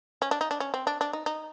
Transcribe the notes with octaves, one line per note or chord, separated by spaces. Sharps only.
C#4
D4
D#4
D4
C#4
C4
D4
D4
D#4
D#4